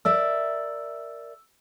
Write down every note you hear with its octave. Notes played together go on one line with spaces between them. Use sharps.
A#4 D5 E5 E6